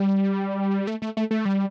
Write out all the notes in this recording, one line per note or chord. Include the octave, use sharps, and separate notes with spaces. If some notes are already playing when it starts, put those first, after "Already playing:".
Already playing: G3
A3
A3
A3
A3
G3